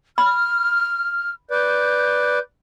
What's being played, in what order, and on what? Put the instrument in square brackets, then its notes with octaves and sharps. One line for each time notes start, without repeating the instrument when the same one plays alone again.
[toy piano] B5 [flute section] F6
[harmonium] B4 D5 [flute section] G6